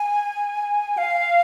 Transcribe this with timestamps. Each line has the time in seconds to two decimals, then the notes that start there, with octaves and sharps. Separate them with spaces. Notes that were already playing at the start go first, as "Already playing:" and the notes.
Already playing: G#5
0.98 F5